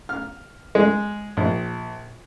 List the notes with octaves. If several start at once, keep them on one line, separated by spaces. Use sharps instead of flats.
F6
G#3
A#1